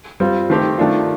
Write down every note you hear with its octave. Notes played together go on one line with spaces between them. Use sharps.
G3 C4 F4
D#3 A3 C4 G4
D#3 A3 D4 F4